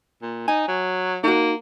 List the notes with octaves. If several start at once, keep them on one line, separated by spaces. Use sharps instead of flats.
A#2
D#4 G#5
F#3
A#3 D#4 F#4